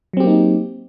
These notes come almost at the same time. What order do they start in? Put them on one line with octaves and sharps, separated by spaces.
F#3 C4 G4 A#3 D#4